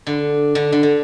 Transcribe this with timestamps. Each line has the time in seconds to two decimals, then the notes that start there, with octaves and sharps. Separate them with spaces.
0.07 D3
0.55 D3
0.72 D3
0.83 D3